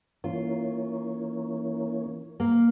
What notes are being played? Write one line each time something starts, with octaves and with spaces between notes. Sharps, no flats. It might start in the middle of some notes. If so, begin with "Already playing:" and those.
E3 A#3 C#4 F4
A#3